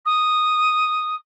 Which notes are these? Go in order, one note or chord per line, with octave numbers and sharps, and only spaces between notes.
D#6